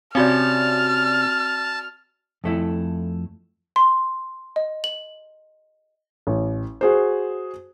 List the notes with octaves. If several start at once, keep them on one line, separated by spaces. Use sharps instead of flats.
C3 C4 C#4 F#4 D5 A5 F6
F2 A3 E4
C6
D#5
F#7
A1
F#4 G#4 C5